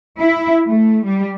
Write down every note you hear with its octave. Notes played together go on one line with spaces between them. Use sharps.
E4
A3
G3